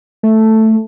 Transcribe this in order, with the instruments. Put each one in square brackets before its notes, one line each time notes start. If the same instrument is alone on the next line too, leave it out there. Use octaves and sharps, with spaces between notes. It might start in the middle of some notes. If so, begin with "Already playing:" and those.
[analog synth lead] A3